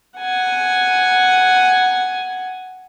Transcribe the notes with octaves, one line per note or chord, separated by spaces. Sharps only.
F#5 G#5